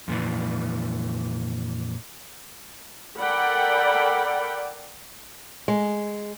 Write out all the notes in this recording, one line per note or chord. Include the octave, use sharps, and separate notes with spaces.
F2 A#2 E3
A4 A#4 D5 F#5 G5 B5
G#3